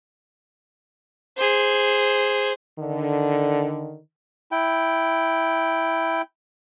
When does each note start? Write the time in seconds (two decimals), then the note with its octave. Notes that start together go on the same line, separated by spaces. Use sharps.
1.37 G#4 C5
2.79 D3 D#3
4.52 E4 G5